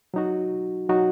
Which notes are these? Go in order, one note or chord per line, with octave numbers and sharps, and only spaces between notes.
F#3 D#4 F#4
F#3 D#4 F#4